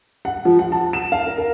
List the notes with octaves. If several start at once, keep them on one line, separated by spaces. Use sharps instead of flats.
F#5
F3
F#5
A5
E7
F5
A#4
A#4